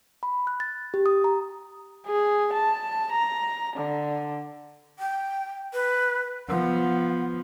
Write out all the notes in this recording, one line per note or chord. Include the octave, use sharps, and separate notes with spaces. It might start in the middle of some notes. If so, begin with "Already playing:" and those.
B5
F#6
A6
G4
D#6
A#5
G#4
A5
A#5
D3
G5
B4
F3 B3 F#5